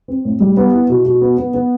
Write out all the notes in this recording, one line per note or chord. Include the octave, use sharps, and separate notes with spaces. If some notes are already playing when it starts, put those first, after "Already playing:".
C4
A2
G3
B3
E4
B2
B2
B3
B3
B3